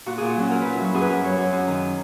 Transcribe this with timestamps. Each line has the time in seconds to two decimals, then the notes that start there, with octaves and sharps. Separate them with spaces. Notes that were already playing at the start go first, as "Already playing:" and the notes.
0.06 A#2 F#4
0.18 A#2 G#4
0.29 F#4
0.36 F#3 C#4
0.50 F#3 A#4
0.62 A#2 B4
0.73 E4
0.80 F#3 F#4
0.94 F#2 G#4
1.02 B4
1.09 F#2 A#4
1.23 F#3 C#5
1.38 F#2
1.53 F#2
1.68 D#3